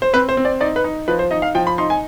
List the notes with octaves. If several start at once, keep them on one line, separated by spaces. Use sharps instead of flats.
C5
C4 B4
C5
C4
D5
D#4 D5
B4
D#4
F3 B4
C5
D#4 D#5
F5
F3 G5
B5
D#4 C6
G#5